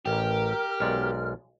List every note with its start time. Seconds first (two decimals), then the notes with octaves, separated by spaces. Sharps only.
0.06 A1 G4 A#4 F6
0.80 B1 G#3 D5